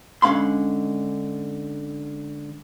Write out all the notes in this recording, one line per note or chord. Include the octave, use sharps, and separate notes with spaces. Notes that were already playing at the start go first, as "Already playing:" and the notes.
D3 G#3 C#4 F5 B5 C6